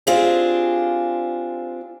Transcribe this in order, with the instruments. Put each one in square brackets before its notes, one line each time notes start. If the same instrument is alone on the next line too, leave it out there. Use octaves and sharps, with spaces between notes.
[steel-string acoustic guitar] C4 D4 F4 G4 G#4